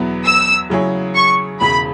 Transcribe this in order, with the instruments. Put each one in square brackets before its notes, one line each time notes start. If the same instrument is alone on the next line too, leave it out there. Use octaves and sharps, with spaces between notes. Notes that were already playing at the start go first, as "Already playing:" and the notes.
Already playing: [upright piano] E2 B2 F#3 B3 E4
[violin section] E6
[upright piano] C#3 F#3 E4 G#4 C#5
[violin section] C#6
[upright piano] E1 E2 C#3 G#3 [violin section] B5